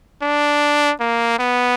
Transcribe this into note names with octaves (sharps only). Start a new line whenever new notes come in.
D4
A#3
B3